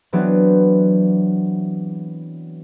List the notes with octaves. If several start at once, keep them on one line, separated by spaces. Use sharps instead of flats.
E3 F#3 B3 C4 D4